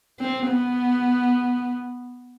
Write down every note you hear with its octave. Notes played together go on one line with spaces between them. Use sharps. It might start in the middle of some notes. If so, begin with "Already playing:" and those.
C4
B3